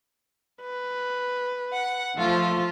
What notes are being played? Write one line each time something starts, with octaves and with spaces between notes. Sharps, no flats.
B4
F#5
F3 A3 F4